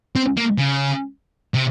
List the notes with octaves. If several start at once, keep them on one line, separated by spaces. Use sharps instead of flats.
C4
A#3
C#3
C3